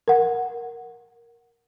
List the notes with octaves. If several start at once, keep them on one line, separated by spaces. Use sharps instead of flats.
A#4 F#5